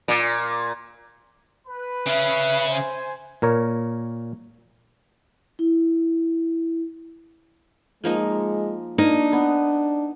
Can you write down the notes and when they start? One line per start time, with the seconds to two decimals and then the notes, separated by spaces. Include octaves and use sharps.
0.08 A#2
1.68 B4 B5
2.06 C#3 C#4 E5
2.70 C5 G#5
3.42 A#2 A#4 C#5
5.59 E4
8.04 F3 G#3 A#3 D#4
8.98 A#3 D4 D#4
9.33 B3